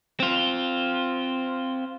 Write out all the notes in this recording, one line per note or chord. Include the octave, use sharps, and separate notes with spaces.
C4 F4